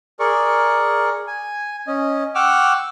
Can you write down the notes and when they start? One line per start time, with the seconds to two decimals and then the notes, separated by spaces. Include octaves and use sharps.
0.20 G#4 A#4 D5 C#6
1.27 G#5
1.87 C#4 D#5
2.35 F#5 G5 C#6 D6 E6 F6